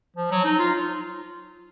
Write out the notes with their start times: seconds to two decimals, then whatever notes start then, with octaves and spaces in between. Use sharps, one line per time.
0.17 F3
0.31 F#3
0.45 D#4
0.59 F4